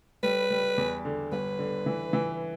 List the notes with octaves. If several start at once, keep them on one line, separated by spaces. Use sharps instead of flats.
G3 B4
G3
E2
D3
G1 B4
D3
E3
E3